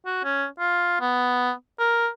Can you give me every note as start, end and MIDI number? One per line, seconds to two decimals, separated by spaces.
0.06 0.23 66
0.24 0.46 61
0.59 0.96 65
1.00 1.52 59
1.79 2.09 70